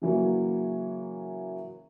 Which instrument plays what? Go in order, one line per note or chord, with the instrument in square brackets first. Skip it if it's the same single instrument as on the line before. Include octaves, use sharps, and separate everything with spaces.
[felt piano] C#3 E3 F#3 A#3